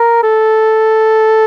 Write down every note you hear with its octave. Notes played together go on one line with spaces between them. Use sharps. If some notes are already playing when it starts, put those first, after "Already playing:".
Already playing: A#4
A4